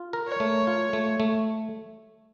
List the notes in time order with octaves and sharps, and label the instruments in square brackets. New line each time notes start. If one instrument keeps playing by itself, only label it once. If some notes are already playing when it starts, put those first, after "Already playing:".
Already playing: [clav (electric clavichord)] F4
A#4
[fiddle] C#5
[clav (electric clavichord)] A3
F4
A3
A3